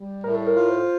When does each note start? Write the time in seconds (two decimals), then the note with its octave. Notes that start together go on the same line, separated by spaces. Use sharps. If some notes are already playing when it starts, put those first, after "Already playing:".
Already playing: G3
0.24 A2 A#4
0.36 A4
0.47 A#4
0.54 F4
0.70 C5